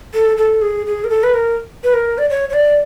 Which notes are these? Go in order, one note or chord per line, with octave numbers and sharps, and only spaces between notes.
A4
A4
G#4
G#4
A#4
A4
B4
A#4
B4
A#4
D5
C#5
C#5
D5